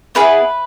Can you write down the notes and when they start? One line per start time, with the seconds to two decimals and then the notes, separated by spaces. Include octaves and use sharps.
0.15 B3 E4 G#4 B4